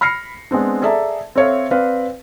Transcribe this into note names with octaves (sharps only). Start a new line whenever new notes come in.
B5 F6 A#6 C7 C#7
G#3 B3 C4 D4
G#4 A4 D5 E5 A5 A#5
C4 A4 C#5 E5 F5
C4 B4 D5 F5